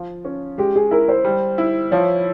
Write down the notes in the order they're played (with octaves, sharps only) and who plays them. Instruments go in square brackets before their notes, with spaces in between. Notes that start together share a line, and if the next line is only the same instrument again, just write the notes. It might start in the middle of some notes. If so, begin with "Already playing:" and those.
Already playing: [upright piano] F3 F4
C#4
[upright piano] G#3 [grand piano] G4
[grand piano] G#4
[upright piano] E4 [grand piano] A#4
[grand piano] C5
[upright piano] G3
E4
[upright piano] F3 [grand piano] C#5